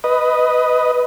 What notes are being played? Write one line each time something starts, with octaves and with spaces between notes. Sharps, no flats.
B4 D#5